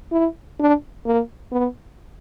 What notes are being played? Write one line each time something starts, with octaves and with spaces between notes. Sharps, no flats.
E4
D4
A#3
B3